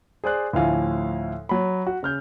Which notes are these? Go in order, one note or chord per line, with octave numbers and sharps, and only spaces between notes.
G#4 C5 D5 F#6
D2 A2 F3 F5 G#5
F#3 B5
F#4
C#3 F6 G6